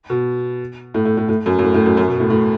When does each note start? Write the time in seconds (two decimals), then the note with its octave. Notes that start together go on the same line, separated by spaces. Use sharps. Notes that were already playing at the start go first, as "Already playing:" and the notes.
0.10 B2
0.94 A2
1.05 A2
1.17 A2
1.29 A2
1.46 F#2
1.59 F#2
1.63 A2
1.74 A2
1.86 F#2
1.97 F#2
2.08 B2
2.20 A2
2.30 A2